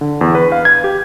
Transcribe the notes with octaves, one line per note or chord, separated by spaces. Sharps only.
D3
E2
B4
F5
G#6
G4